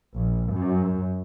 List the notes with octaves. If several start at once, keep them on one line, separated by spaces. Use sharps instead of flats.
A#1
F#2